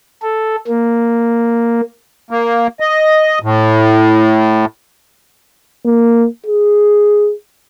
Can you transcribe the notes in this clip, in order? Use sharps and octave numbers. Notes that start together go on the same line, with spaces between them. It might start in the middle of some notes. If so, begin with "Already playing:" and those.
A4
A#3
A#3
D#5
A2
A#3
G#4